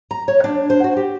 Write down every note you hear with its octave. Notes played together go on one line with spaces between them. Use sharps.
A#5
C#5
D4
C5
F#4
G4